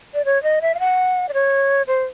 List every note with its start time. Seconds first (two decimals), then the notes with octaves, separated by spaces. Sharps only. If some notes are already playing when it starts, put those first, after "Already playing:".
0.14 D5
0.25 C#5
0.43 D#5
0.62 E5
0.75 F5
0.80 F#5
1.29 D5
1.34 C#5
1.88 C5